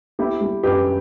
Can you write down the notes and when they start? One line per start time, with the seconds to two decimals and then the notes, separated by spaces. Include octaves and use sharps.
0.19 B3 E4 G4
0.41 G3
0.63 F#2 G4 B4